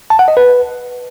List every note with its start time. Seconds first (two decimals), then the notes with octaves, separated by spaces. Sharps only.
0.10 A5
0.19 F#5
0.28 D#5
0.37 B4